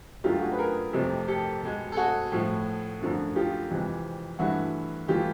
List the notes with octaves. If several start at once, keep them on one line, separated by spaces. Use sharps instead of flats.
F#2 D3 F#3 A3 F4 G4
F#4 G#4
B4
G#4 A#4
F2 C3 F3 A3
G4 A4
B2 G#3
A4
F#4 G#4
A2 F3 A3
F#2 D3 F3 A3
F4 G4
F2 C3 E3 G#3
G2 E3 A3 E4 F#4
E3 A3 F4 G4